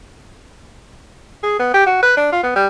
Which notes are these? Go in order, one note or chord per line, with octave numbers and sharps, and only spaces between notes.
G#4
B3
G4
F#4
B4
D4
F4
B3
G3